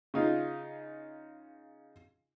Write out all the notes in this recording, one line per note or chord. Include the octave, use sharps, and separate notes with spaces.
C#3 D#4 F4